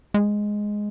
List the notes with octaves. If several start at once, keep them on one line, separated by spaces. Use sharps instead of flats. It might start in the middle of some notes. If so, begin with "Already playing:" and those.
G#3